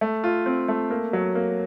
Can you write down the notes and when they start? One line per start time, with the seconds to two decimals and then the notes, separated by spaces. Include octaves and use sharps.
0.01 A3
0.24 F4
0.46 C4
0.68 A3
0.90 A#3
1.13 F#3
1.35 A#3